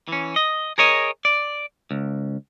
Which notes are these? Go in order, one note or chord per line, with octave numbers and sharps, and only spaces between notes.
E3 C#4
D#5
G#4 A#4 C#5 D#5
D5
C#2